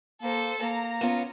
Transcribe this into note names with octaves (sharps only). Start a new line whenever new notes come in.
A#3 A4 C5
A#3 A#5
B3 C#4 F4